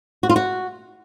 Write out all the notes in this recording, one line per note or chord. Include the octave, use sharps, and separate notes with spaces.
F#4
F4
F#4